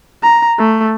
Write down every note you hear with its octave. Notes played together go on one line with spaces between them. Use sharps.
A#5
A3